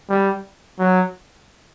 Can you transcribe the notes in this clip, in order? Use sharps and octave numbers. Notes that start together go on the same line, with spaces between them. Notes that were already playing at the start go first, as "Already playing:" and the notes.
G3
F#3